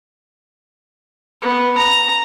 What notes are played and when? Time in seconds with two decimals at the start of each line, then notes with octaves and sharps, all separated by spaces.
1.42 B3
1.77 A#5